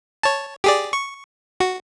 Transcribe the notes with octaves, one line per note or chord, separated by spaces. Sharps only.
C#5 A5
G4 G#4 D5
C#6
F#4